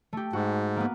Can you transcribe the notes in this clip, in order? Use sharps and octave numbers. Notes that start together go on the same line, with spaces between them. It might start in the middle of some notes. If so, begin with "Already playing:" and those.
A3 G4
G#2 F#4
A#3 B3